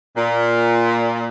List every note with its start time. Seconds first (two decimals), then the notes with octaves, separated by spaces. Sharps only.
0.16 A#2